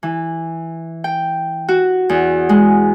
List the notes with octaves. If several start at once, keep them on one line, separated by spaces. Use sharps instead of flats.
E3
G5
F#4
E2
G#3